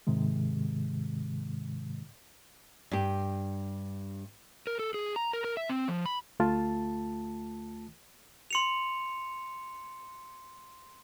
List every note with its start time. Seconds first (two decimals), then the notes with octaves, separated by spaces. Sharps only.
0.07 G#2 C3 D#3 G#3
2.91 G2 G4
4.67 A#4
4.79 A4
4.94 G#4
5.16 A#5
5.33 A#4
5.44 A#4
5.57 E5
5.69 C4
5.88 F3
6.06 B5
6.40 D2 A3 F4 A5
8.51 C6 C#7 F7